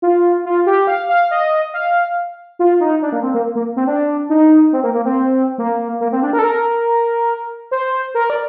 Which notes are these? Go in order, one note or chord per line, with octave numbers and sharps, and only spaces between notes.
F4
F4
G4
F5
F5
D#5
F5
F4
D#4
D4
A#3
C4
A#3
A#3
C4
D4
D#4
C4
A#3
A#3
C4
A#3
A#3
C4
D4
A#4
A4
A#4
C5
A#4
D5